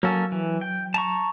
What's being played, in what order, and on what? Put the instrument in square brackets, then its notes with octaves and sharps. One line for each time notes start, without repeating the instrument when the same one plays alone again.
[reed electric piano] F#3 [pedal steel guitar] A#3 C#4 A4
[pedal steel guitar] E3
G5
A5 A#5 C#6